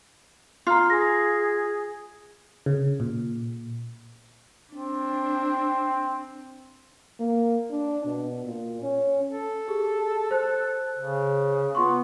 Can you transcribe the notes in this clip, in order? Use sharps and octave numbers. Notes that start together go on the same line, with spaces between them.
F4 A#5 C7
G#4 A#6
C#3
A#2
C4 D4
A#3
D4
B2
A#2
C#4
A4
G4 G#4
C5 F#6
C#3
B3 F4 C6 C#6